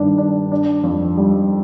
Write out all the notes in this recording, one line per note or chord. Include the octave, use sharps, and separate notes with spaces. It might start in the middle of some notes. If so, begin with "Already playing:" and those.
Already playing: G2 D#3 D4
D4
D4
F2
G3